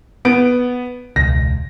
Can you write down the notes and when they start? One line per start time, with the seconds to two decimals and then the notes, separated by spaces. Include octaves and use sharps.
0.25 B3 D7
1.16 E1 C#2 A#6